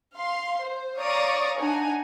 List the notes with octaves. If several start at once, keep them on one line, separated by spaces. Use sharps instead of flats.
F5 C6
C5
C#5 D5 F5 A#5 C#6 D#6
D4 D#4 F#5 G#5 A#5